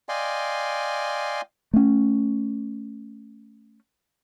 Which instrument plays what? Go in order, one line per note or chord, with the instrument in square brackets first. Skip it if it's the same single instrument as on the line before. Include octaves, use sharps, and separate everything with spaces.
[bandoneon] D5 D#5 F5 G5 G#5 C6
[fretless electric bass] A3 C#4